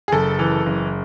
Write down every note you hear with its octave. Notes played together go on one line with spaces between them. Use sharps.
G#4
F#1 A4
E3
F#1